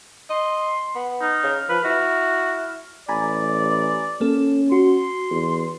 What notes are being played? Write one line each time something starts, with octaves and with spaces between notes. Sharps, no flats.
D#5 C6
B3
D#4 F6
C#3
F3 B4
E4 F#4
A1 D5 G#5 A#5 B5
A#3 C#4 A4
F#4 C6
E2